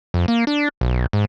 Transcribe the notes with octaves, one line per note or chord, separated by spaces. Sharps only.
F2
A#3
D4
B1
G#2